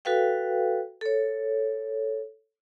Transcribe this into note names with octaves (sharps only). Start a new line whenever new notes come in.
F#4 A4 B4 F5 G5
A4 C#5